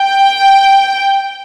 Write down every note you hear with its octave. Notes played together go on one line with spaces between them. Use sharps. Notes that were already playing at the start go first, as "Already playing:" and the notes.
Already playing: G5